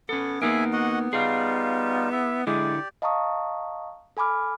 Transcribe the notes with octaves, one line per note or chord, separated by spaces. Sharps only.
B3 C#4 A4
A#3 B3 D#4 G#4 A#4 E5 G#5
F#4 D#5 F#5
G3 D#4 F4 G#4 F5
E4 E5
D3 G#3 E4 G4 D5
D#5 F5 A5 A#5 C#6 D#6
A4 G#5 B5 D6 F6